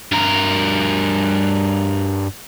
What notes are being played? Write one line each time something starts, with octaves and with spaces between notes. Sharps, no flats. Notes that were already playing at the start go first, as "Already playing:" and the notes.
G2 A#4